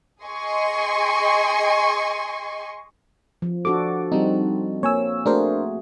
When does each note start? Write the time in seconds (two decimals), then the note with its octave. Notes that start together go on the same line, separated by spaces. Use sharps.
0.24 G#4 D#5 G#5 C6 C#6
3.42 F3
3.65 D4 F#4 A4 D6
4.12 F3 G3 C4 D#4
4.83 A#3 C#5 G#5 E6
5.26 A3 D4 F#4 G#4 A#4 C5